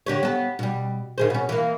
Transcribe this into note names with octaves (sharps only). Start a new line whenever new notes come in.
D3 G4 C#5
B3 A4
B2 G3
D#3 G#4 C5
B2 C#4
E3 A#3